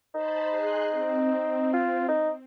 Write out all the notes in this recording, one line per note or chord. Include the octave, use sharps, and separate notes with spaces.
D#4 C5 A5 B5
G#4 C6 F#6
C4
F4
D#4